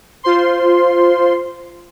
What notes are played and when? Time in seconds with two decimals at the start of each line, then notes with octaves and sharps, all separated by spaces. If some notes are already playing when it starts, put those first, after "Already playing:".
0.23 F4 C5 C6